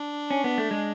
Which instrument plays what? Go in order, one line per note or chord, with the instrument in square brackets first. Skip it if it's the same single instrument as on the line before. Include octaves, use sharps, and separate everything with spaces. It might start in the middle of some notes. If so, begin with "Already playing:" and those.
Already playing: [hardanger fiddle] D4
[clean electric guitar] C#4
B3
A3
G#3